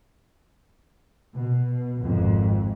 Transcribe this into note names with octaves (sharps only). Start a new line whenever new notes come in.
B2
G#1 F2 G#2